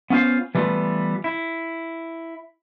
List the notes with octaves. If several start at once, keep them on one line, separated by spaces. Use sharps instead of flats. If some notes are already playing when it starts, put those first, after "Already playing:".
B3 C#4 F4 C5 F5
E3 G3 A3 B3 F4
E4